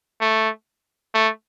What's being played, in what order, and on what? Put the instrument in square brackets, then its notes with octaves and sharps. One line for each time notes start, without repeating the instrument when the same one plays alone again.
[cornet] A3
A3